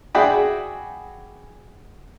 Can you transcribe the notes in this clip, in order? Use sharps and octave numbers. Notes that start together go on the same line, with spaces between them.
F#4 G#4 D5 E5 G5 B5